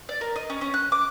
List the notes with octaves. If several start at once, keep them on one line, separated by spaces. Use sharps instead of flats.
D5
A#4
D#5
C#4
C#4
F#6
D6